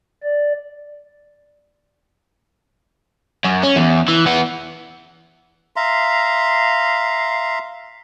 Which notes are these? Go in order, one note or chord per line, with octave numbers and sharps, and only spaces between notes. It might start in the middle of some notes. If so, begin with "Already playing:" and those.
D5
F#2
C#4
E2
E3
E3 B3
E5 F5 A#5 C6